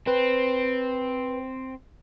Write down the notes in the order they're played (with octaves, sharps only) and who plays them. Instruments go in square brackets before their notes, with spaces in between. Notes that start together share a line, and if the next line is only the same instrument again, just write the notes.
[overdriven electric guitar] C4 [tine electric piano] B4